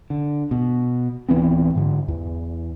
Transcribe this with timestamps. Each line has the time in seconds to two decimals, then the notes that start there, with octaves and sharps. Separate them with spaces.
0.10 D3
0.51 B2
1.29 D1 E3 B3 C4
1.75 G#2 D3
2.08 E2